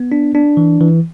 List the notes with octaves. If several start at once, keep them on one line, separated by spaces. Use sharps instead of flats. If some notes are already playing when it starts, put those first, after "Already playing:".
Already playing: B3
D4
D4
E3
E3